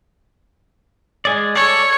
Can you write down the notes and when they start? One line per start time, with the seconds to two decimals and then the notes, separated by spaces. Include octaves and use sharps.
1.25 G#3 G#4 D5
1.56 A4 C#5 D5